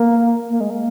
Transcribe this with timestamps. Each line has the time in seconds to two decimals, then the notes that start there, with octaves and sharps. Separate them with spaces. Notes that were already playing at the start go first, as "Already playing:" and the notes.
Already playing: A#3
0.50 A#3
0.60 G#3
0.70 A#3